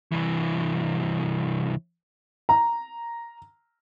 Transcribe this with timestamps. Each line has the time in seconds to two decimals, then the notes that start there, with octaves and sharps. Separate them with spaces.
0.12 C2 E3
2.49 A#5